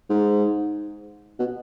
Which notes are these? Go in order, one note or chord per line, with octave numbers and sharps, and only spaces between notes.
G#2
B2